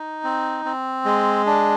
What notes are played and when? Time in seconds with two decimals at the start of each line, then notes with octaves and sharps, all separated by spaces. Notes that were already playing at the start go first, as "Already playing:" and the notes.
Already playing: D#4
0.24 C4
0.65 C4
1.05 G#3
1.46 D4